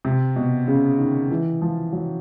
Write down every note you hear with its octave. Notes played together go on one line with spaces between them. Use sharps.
C3
B2
C#3
D#3
E3
F3
F#3